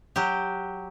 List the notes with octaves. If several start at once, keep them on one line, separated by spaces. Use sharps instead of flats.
F#3 G4